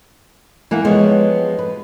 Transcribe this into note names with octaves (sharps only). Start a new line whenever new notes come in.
E3 A#3 F#5
F3 G#3 B3 G4 C#5
B4